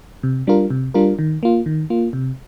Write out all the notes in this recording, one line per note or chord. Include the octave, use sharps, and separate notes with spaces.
C3
G3 D4 F4 A#4
C3
G3 D4 F4 A#4
D#3
A#3 F4
D#3
A#3 F4
C3